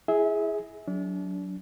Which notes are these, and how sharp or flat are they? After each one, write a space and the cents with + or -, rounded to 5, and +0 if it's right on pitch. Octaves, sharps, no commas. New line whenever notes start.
E4 +15 G#4 +0 E5 -30
F#3 +0 D4 -35